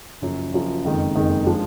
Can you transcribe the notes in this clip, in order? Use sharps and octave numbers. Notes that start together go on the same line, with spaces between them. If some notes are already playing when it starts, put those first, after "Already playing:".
F#1 F#2 F3
F#1 F#2 F3
F#1 F2 D#3 G#3 D#4
F#1 F2 D#3 G#3 D#4
F3 G#3 D4 F4